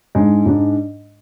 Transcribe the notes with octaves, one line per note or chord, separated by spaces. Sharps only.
G#2 G#3 D4
G#2 G#3 D4